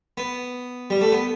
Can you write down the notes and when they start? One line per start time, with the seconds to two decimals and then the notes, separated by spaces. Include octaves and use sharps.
0.17 B3
0.90 G3
1.01 A3
1.12 B3